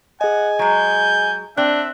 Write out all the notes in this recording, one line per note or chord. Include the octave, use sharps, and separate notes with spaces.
G#4 D#5 F#5 G#5
F#3 G#3 G6
C4 D4 E5 F#6